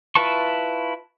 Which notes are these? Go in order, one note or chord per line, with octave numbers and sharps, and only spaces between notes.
E4 F4 B4 A5 C#6